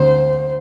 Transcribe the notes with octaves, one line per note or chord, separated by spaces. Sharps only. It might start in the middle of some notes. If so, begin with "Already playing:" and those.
Already playing: D2 C4 C5